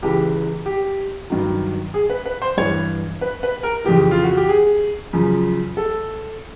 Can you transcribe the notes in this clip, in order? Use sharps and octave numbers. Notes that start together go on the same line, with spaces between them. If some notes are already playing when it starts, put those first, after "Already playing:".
C#2 C#3 E3 G4
G4
G2 D#3 F#3
G#4
B4
B4
C5
G2 E3 C#5
B4
B4
A#4
F2 C#3 E3 G4
F4
F#4
G4
G#4
F#2 C#3 F3
A4